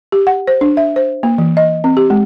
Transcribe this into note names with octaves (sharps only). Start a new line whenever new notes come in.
G4
F#5
C5
D4
E5
C5
A#3
E3
D#5
C4
G4
G#3